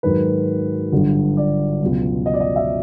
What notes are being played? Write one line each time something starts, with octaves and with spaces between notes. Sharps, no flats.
G#2 D#3 F#3 B4
G1 G2 D3 F#3
D5
C#2 B2 F#3
D#5
D5
D#5
E5